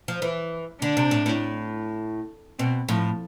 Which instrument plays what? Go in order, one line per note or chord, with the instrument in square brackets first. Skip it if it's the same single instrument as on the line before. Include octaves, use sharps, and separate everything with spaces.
[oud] F3
E3
[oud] D3 [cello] D4
[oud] C3
A2
A2
[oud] B2 [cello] C4
[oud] A2 [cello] F3